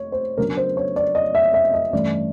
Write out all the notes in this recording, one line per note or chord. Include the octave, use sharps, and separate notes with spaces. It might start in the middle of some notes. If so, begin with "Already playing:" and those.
Already playing: A3 C#5
C5
C#3 F#3 B3 D4 A#4
C5
C#5
D5
D#5
E5
E5
D#5
G2 E3 A3 C#4 D5